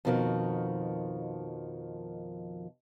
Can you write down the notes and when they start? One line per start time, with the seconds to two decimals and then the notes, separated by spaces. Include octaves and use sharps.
0.05 F2 B2 D#3 F3 F#4 A#4